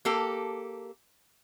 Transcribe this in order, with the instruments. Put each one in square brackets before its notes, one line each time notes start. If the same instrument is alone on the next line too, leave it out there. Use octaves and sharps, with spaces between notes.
[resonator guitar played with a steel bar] A#3 G4 A4